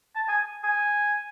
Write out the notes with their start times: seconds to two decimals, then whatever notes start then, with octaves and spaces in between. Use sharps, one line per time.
0.15 A5
0.29 G#5
0.64 G#5